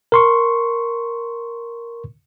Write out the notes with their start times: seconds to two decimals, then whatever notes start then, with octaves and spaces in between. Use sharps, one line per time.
0.12 A#4 C6 C#6